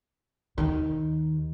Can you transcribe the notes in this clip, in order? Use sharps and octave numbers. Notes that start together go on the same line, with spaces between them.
D#2 D#3